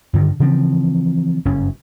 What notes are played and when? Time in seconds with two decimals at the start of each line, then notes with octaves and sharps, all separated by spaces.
0.13 G2 D3 D#3
0.40 C#3 E3 F3 C4
1.45 F#1 G2 C#4